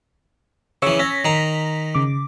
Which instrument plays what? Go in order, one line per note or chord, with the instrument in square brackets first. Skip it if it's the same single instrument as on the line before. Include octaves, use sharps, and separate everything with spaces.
[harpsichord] C#3 E3 [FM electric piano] C#5 C#6 E6
[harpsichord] C#4 [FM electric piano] A#6 B6
[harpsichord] D#3 A#5
[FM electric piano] C#3 D6